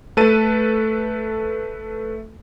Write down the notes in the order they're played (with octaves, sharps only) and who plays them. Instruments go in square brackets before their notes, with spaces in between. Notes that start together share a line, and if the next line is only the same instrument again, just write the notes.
[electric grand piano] A3 A4 B4 A5 A6 D#7